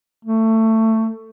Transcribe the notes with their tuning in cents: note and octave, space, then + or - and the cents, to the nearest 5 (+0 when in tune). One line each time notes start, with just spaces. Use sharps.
A3 +20